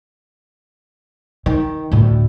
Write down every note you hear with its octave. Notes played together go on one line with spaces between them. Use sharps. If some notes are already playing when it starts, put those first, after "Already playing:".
D#3
D2 A2